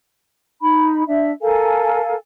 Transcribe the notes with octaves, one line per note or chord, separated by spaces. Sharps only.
D#4 B5
D4 E5
A4 A#4 F5 G#5